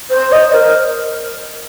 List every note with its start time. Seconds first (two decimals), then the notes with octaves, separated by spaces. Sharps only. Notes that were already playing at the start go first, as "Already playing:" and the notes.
0.09 C5
0.31 D#5
0.52 A#4